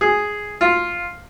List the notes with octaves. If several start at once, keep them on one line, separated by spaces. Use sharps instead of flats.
G#4
F4